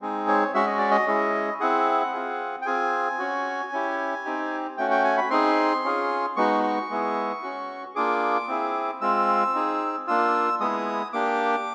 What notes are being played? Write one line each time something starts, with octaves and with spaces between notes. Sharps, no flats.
G#3 C4 D#4 G#4
C#5
G#3 C#4 F#4 E5
D#5
D5
D#5
G#3 C#4 E4 G#4
C4 E4 G#4 F#5
C4 F4 G#4
G5
C4 F4 G#4 G#5
C#4 F#4
C#4 E4 G4
C4 D#4 G4
A3 C#4 F#4 G5
G5
G#5
B5
C4 D#4 G#4 C6
C#4 F4 G#4
G#3 B3 D#4 F#4 C#6
C#6
G#3 B3 E4 G#4
C#4 F#4
A#3 D4 F4 G#4 D6
C4 E4 G#4
G#3 C4 F4 E6
C4 D#4 G#4
A#3 D4 F4 E6
G#3 B3 E4 G#4 D#6
A#3 D4 G4 D6